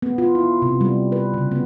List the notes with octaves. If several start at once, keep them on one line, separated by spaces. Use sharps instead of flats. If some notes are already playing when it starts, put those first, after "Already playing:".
B3
F4
E4
C3
G3
B4
C#3
B3